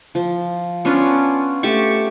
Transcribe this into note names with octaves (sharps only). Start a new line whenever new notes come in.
F3
B3 C#4 D4 F4
A3 G4 A5 C#6